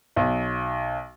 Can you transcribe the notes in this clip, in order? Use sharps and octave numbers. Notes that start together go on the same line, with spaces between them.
B1